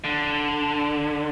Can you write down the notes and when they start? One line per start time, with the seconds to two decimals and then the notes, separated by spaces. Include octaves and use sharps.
0.04 D3